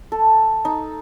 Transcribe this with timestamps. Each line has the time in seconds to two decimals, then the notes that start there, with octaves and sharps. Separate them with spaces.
0.12 A4
0.65 D#4